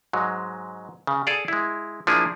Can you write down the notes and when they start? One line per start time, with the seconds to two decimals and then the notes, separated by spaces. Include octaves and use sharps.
0.13 G#2 F#3 G#3
1.07 C#3
1.27 G#4 A4 D5 F5
1.48 G#3 E4
2.07 F3 A#3 D4 E4 G#4